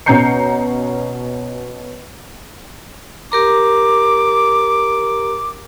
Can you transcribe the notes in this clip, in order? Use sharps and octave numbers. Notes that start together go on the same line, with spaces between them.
B2 C#4 A#5 G6 C7 C#7
G4 A#4 A#5 D6